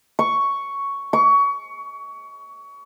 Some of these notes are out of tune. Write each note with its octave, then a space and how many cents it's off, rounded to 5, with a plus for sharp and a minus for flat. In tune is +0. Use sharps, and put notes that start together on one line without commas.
C#6 +5
C#6 +25